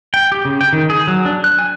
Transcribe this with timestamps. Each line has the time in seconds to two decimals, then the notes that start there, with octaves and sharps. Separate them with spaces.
0.14 G5
0.32 G4
0.45 C#3
0.61 G5
0.73 D#3
0.90 G#4
1.07 F#3
1.26 D4
1.44 F#6
1.59 G#5